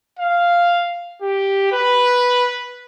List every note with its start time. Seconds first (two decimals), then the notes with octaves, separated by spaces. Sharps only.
0.19 F5
1.22 G4
1.72 B4